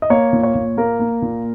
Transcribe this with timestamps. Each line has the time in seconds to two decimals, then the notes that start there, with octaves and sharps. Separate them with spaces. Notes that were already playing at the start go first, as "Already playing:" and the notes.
0.02 D#5
0.10 A#3 C#5
0.33 A#2
0.43 C#5
0.55 A#2
0.77 A#3 A#4
1.00 A#3
1.22 A#2